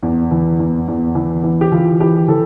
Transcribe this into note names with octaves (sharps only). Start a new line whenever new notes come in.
E2
E3
E2
E2
E3
E3
G4
E3 F4
E3 G4
E3 A4